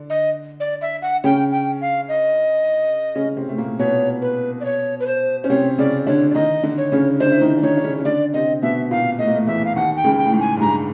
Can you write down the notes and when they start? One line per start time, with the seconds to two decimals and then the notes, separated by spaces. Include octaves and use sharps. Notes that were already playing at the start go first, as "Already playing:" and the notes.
Already playing: D3 D4
0.10 D#5
0.60 D5
0.82 E5
1.02 F#5
1.24 C#3 C#4 G5
1.52 G5
1.81 F5
2.09 D#5
3.15 C#3 C#4
3.37 C3 C4
3.49 A3
3.58 A#2 A#3
3.79 B2 B3 C#5
4.22 B4
4.60 D5
4.65 C#5
5.00 B4
5.07 C5
5.43 C#4 C5
5.50 C3 C4 C#5
5.78 C#3 C#4 D5
6.07 D3 D4 C#5
6.30 D5
6.35 D#3 D#4 D#5
6.63 D3 D4
6.78 C#5
6.92 C#3 C#4
7.20 D3 D4 C5
7.31 E4
7.41 D#3 D#4
7.57 D4
7.63 D#3 D#4 C#5
7.77 D4
7.84 C#3 C#4
7.98 C#4
8.05 D3 D4 D5
8.34 C3 C4 D#5
8.62 B2 B3 E5
8.91 A#2 A#3 F5
9.19 A3 D#5
9.27 A#3
9.35 A2 A3
9.47 E2 E3 E5
9.65 F5
9.75 D#2 D#3 F#5
9.97 G5
10.04 C#2 C#3
10.18 G5
10.25 A2
10.33 G#2
10.40 G#5
10.57 G2
10.61 G#2 A#5